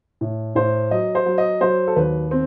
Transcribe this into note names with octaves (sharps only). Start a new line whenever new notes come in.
A2
A2 C5
F#3 D#5
C5
F#3
D#5
F#3 C5
A4
D#2 B4
C4